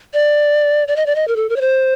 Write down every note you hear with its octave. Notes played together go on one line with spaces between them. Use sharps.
D5
D5
D#5
D5
D#5
A#4
A4
A#4
C#5
C5